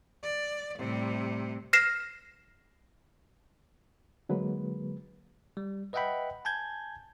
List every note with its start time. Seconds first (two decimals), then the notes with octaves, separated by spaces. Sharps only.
0.23 D5
0.78 A2 C3 G3
1.73 F6 A#6 C7 E7
4.29 D3 F#3 G#3 A#3 B4
5.57 G3
5.93 B4 D#5 E5 F#5 G5 B5
6.45 G#5 A5 G6 G#6